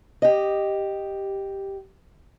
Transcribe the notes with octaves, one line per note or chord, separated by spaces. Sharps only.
G4 D#5